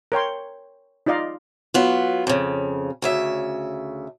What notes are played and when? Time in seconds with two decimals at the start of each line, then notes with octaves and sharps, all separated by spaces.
0.12 A#4 C#5 G5 C6
1.06 D#4 F4 D5 D#5 F5
1.74 F#3 B3 F4
2.27 F2 C#3
3.02 D2 C#3 E5